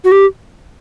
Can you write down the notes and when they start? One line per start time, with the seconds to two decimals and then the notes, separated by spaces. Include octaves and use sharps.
0.04 F#4
0.12 G4